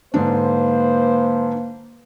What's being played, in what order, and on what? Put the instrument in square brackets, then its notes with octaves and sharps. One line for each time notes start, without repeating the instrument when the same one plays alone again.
[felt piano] G#2 D3 D4 [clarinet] A#3 [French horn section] B4 C5